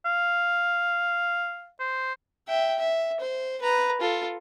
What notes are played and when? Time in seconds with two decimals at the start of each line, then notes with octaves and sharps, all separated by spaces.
0.05 F5
1.80 C5
2.48 E5 G5
2.78 E5
3.20 C5
3.62 B4 A#5
4.01 F4 A4